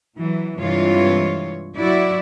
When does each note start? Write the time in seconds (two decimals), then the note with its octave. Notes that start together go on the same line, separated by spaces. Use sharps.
0.18 E3 F#3
0.58 G2 C3 E3 G#3 F4 C#5
1.78 F#3 E4 F#4 D5